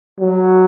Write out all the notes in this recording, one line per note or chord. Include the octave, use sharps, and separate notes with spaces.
F#3